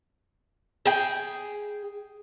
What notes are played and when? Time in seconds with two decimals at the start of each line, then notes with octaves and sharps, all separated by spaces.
0.86 G#4 G5